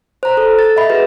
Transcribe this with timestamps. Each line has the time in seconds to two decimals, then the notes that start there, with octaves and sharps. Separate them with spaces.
0.23 C5 A#5
0.37 A4
0.59 A6
0.76 D#5 E5 B5
0.90 F#4 G#4 B4